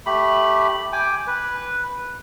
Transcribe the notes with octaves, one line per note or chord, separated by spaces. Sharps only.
A3 G4 B5
G5 G#5 D6
B4